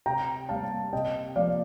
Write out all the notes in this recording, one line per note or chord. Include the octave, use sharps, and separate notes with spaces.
C3 G5 A#5
G3 A#3 F5 A5
C3 D#5 G5
F3 A#3 D5 F5